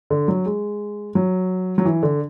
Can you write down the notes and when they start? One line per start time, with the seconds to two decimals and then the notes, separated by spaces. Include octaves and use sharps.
0.10 D3
0.28 F#3
0.46 G#3
1.15 F#3
1.78 F#3
1.85 E3
2.03 D3